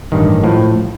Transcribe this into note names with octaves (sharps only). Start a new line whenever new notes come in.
A1 G2 D#3
A2 F3